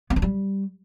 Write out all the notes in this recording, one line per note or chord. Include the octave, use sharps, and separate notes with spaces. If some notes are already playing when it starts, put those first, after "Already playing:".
B3
D4
G3